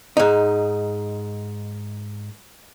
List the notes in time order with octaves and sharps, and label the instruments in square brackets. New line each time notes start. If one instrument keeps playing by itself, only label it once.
[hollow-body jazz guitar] G#2 D#4